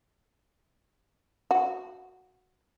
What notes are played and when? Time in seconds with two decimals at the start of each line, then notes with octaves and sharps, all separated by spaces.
1.51 F#4